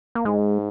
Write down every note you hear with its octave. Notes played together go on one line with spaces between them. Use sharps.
A#3
G#2 G#3